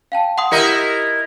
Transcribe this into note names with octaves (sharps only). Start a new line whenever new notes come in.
F5 G5 A5
F#5 C6 D#6
E4 G4 A#4 D#5 G6 C#7